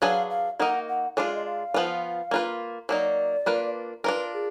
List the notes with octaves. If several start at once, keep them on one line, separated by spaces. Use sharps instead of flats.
F#3 D4 G#4 B4 F5
F5
A#3 D#4 F#4 A#4 D#5 F#5
F#5
G#3 D4 F4 F5
D#5
F5
F3 B3 F4
A#3 F4 B4
F#3 A#3 D#4 D5
A#3 D4 F4 B4
D4 F4 A#4 B4
G#4